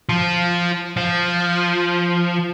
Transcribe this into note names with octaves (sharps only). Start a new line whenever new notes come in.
F3
F3